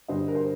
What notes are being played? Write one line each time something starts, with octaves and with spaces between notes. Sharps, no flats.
G2 D3 C5 D#5
A#4
C5